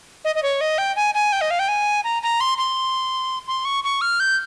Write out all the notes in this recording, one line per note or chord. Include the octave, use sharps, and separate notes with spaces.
D#5
D#5
C#5
D#5
G5
G#5
G#5
G5
D#5
F5
G5
G#5
A#5
A#5
C6
C6
C6
C#6
C#6
F6
G6